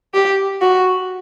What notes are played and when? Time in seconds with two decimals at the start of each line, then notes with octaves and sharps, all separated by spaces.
0.14 G4
0.61 F#4